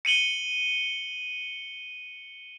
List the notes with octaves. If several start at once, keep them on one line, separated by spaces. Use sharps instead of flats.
C#7 D#7 F#7 G7